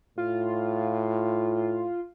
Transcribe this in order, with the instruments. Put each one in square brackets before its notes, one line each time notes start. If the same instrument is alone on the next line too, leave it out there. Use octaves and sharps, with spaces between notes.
[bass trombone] A2 [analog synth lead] F4